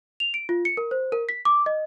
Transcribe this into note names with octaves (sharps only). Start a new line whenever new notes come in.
F7
D7
F4
C#7
A#4
C5
A#4
B6
D6
D#5